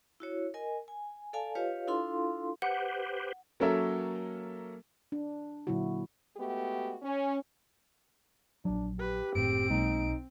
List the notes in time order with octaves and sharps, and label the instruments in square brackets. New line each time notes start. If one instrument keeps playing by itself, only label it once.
[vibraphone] E4 F#4 C#5
A#4 D#5 G#5
G#5
A4 D5 F5 G#5 A5
F4 G4 B4 C#5 D#5 F5
D4 E4 F4 A4 F5 C6
[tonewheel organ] G4 B4 C5 [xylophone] F#5
[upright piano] F#3 A#3 C#4 A4 A#4 E5
[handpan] D4
A#2 D3 F#3 E4 F#4
[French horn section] G#3 A3 B3 F#4 G4
C#4
[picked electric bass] A#1 F#3 [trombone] D4
[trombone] G4 [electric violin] B4
[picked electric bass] F#1 A2 [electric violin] C4 D7
[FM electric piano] B1 [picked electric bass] G#3 A#3 [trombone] D#4